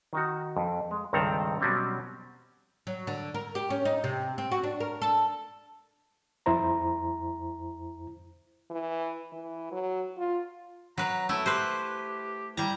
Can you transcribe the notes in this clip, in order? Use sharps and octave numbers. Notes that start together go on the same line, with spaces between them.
D#3 D#4 F#4
F2
G#3
C#2 G2 D#3 C4 A4 A#5
B2 F#3 G3 C4 C#4
F#3
D3
A#4
G4
C#4
D#4
C3
C4
F#4
D4
A#4
A4
F2 E4 C5 A#5
E3
E3
F#3
F4
F#3 B4 A#5
A3 E4 E6
G4 B4 C5
G3 E4 A#5